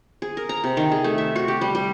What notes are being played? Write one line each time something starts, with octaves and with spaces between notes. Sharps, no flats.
G#4
A#4
A#5
C3
D#3
G#4
A3
E5
F#4
G4
G3
G3